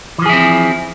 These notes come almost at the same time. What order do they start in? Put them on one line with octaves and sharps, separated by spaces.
E3 F3 G#4 E4 C4